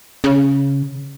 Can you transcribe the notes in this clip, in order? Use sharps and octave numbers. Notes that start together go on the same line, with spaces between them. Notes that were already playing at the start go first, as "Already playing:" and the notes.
C#3